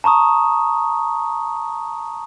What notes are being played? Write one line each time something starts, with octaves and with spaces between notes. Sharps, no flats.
A5 A#5 C#6 D#6